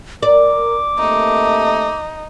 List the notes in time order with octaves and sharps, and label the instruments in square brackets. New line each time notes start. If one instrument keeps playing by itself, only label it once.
[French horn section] A#4 [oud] D5 [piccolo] D6
[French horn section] C3 A3 A#3 [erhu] D#4